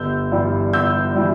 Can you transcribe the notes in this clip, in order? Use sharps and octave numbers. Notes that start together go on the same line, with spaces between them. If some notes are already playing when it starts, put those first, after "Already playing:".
Already playing: G1 E6 G6
G2 E3 G3
G1 E6 G6
E3 G3